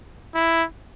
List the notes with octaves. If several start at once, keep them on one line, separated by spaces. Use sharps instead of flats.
E4